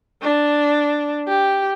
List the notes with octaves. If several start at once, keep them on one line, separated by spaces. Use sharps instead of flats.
D4
G4